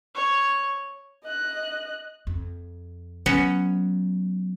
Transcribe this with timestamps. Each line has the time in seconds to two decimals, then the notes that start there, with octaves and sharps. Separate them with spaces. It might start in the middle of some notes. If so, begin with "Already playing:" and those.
0.15 C#5
1.24 D#5 F#6
2.27 F2
3.26 F#3 B3 C#4 F#4